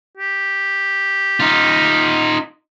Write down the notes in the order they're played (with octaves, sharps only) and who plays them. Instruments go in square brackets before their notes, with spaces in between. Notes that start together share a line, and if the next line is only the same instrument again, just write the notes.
[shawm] G4
[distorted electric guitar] D#4 F4